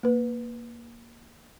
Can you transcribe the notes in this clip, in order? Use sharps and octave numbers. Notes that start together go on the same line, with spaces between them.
A#3 B4